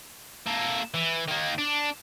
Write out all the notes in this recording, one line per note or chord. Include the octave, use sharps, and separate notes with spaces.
A#3 A4
E3
D#3 A#3
D4